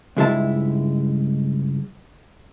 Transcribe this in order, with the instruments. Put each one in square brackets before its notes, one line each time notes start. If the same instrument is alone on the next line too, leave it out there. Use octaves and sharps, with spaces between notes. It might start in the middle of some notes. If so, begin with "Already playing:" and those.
[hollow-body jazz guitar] C#2 G2 G#3 E4 E5 A5